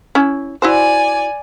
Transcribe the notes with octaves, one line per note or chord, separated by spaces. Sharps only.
C#4 E4
E4 F#4 C5 D5 G#5